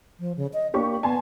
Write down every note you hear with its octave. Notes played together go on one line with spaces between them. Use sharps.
F3
C#3
D#5
A#3 D4 G4 C#6
B3 G#5 A5 C6